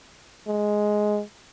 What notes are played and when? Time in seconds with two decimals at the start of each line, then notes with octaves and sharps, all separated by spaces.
0.47 G#3